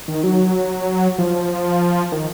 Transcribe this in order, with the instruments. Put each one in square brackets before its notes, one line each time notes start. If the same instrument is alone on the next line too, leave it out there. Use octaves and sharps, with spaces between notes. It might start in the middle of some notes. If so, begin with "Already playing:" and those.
[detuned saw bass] D#3
F#3
F3
D#3